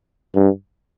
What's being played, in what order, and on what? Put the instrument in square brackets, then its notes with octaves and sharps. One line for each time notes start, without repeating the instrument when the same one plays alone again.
[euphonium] G2